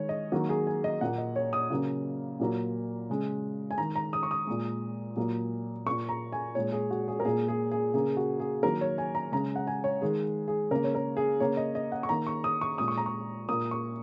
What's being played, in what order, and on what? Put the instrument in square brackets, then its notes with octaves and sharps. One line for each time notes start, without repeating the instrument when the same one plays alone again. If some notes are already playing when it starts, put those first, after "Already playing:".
Already playing: [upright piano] D#3 G#3 C#5
D#5
D#3 F#3 A#3 F#4
G#4
G#5
D#5
A#2 A#3 F#5
D#5
C#5
D#6
C#3 F#3 A#3
A#2 F#3 A#3
C#3 G#3
G#5
D#3 G#3 A#5
A#5
D#6
C#6
D#6
A#2 G#3
A#2 F#3 A#3
A#2 A#3 C#6
A#5
G#5
A#2 G#3 C#5
G#4
F#4
G#4
A#4
A#2 A#3 G#4
G#4
G#4
C#3 A#3 G#4
F#4
G#4
D#3 F#3 A#3 A#4
C#5
G#5
A#5
C#3 G#3 A#5
F#5
G#5
C#5
D#3 G#3 G#4
G#4
C#3 A#3 A#4
C#5
A#4
G#4
C#3 A#3 C#5
D#5
D#5
F#5
C#6
D#3 A#3 A#5
C#6
D#6
C#6
A#2 G#3 D#6
C#6
A#5
C#6
A#2 A#3 D#6
C#6